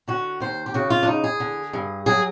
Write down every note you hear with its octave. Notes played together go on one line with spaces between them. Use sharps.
D3 F#4
D#2 C5
G4
C#3 F#4
F4
D4
E2 D#4
G#4
D3
G2
F#3 G#4